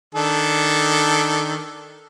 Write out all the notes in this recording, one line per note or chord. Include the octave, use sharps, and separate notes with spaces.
D#3 D4 A4